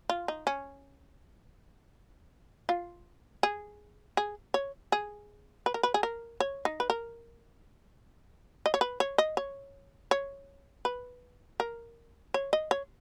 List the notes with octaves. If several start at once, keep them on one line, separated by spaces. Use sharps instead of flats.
F4
D#4
C#4
F4
G#4
G#4
C#5
G#4
B4
A#4
B4
G#4
A#4
C#5
D#4
B4
A#4
D#5
C#5
B4
C#5
D#5
C#5
C#5
B4
A#4
C#5
D#5
C#5